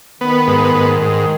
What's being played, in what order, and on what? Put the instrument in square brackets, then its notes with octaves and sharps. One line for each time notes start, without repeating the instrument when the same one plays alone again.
[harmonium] D#3 [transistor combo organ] B3
[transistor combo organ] G#2
G#2
G#2